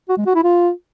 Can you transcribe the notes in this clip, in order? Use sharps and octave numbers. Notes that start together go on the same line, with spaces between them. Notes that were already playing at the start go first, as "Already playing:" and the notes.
F#4
G#3
F#4
E4
F4